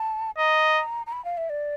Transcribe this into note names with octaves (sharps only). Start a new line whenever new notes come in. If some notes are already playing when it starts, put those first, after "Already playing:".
Already playing: A5
D#5 A#5
A#5
B5
F5
E5
D5